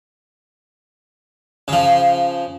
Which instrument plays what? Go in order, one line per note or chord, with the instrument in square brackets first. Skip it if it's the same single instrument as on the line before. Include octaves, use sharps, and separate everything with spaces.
[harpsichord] C#3 F3